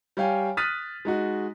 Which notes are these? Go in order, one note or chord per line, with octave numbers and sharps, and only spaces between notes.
G3 C#5 F5 G5 G#5
D#6 F6 F#6 A6 B6 D#7
G#3 D#4 F#4